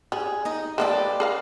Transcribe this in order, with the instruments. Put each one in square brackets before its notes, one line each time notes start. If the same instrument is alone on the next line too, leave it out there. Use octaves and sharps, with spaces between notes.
[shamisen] G3 [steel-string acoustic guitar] G#4
[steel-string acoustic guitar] D#4 D#5
[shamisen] G#3 A#3 A4 [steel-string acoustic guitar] G4 B4 D5
[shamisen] G#4 A#4 F5